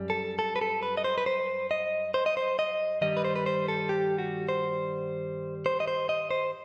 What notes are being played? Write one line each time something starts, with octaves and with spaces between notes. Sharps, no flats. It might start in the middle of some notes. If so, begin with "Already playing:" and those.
Already playing: F#2 G3
A4
A4
B4
A4
B4
D#5
C5
B4
C5
D#5
C5
D#5
C5
D#5
G2 D#3 G3 D#5
B4
C5
B4
C5
A4
G4
F#4
C5
C5
D#5
C5
D#5
C5